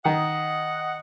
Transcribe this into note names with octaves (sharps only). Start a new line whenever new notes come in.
D#3 D#5 F#5